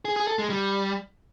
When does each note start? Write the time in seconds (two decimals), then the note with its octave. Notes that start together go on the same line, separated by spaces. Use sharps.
0.05 G#4
0.16 G#4
0.27 A4
0.39 G#3
0.50 G3